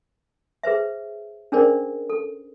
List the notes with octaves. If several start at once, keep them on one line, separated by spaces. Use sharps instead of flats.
G#4 B4 C5 E5
C#4 D4 G#4 A#4 C5 D5
A4